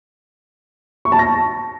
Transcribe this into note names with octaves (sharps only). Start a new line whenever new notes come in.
C#6
A5
A#6